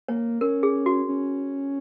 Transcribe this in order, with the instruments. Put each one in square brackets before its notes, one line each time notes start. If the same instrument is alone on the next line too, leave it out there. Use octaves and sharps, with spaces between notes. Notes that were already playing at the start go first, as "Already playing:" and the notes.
[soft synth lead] A#3 [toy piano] C#5
[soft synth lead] C#4 [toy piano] A#4
[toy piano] G#4
F#4
[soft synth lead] C#4